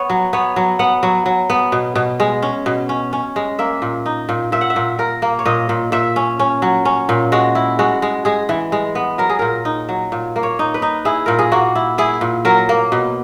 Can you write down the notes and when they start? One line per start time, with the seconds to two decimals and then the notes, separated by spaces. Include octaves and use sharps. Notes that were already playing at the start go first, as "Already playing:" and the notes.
Already playing: B3 C#5
0.10 F#3
0.33 B3 C#5
0.56 F#3
0.79 B3 F#5
1.03 F#3
1.26 F#3
1.50 B3
1.72 B2
1.96 B2
2.20 G#3
2.42 C#4
2.66 B2
2.89 C#4
3.13 C#4
3.36 G#3
3.59 A#3 E5
3.82 A#2
4.06 D#4
4.29 A#2
4.52 A#2 E5
4.61 F#5
4.70 E5
4.76 A#2
4.99 A#2 A#4
5.22 A#3
5.39 C#5
5.45 A#2 D#5
5.69 A#2
5.92 A#2 E5
6.16 C#4
6.39 C#4
6.62 F#3
6.85 C#4
7.09 A#2
7.32 G#3 F#4
7.55 E4
7.79 G#3 F#4
8.02 G#3
8.25 G#3 G#4
8.49 E3
8.72 G#3
8.95 B3
9.18 F#3 A#4
9.29 G#4
9.39 A#2 A#4
9.65 D#4
9.89 F#3
10.12 A#2
10.36 A#3
10.43 C#5
10.59 D#4
10.74 B4
10.82 D#4
11.05 E4 G#4
11.26 A#2 A#4
11.39 G#4
11.52 A#3 F#4
11.75 E4
11.98 E4 G#4
12.21 A#2
12.45 F#3 A#4
12.69 A#3
12.92 B2